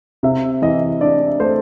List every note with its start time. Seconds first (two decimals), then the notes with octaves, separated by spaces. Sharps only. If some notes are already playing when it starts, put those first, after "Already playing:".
0.23 C3 E5
0.62 E3 D#5
1.01 D4 D5
1.40 A3 C5